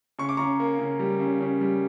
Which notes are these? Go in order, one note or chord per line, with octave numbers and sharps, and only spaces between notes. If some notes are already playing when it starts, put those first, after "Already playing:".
C#3 C#6
D6
C#3 A#5 C#6
A#3
C#3
G3
C#3
C#3
G3